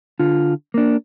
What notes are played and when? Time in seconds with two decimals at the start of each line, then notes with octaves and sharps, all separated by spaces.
0.19 D3 F4
0.74 A#3 D4